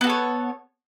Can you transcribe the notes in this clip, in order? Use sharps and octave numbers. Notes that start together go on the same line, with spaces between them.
B3 F#4 A4 C#5